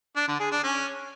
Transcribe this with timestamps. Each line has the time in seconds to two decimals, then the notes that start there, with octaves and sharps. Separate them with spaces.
0.16 D4
0.28 D3
0.40 G#4
0.52 D4
0.64 C#4